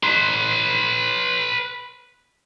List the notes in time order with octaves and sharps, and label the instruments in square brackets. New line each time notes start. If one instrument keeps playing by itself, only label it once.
[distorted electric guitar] B4 C6